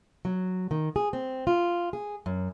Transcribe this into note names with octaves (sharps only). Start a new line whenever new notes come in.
F#3
D#3
G#4
C4
F4
G#4
F#2